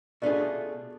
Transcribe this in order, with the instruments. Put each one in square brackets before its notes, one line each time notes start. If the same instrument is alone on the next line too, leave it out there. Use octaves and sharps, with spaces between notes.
[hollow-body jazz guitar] B2 A3 F4 G#4 [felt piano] D4 D5